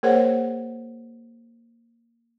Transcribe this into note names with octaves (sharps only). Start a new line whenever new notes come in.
A#3 G#4 A#4 C5 C#5 F#5